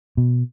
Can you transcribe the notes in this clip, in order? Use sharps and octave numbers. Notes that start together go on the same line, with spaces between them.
B2